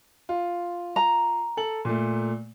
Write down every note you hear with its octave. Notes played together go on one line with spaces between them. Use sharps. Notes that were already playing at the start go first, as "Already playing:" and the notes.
F4
A#5
A4 F#7
A#2 A3